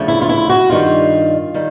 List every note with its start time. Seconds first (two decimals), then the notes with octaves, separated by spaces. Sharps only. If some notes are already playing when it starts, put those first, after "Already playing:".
Already playing: D2 C#3 F3 A3
0.08 E4
0.22 F4
0.29 E4
0.50 F#4
0.69 G2 D#3 G3 F4
1.54 D#3 G3